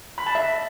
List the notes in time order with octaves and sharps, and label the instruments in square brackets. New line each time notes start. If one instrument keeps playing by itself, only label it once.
[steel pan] B5
A5
E5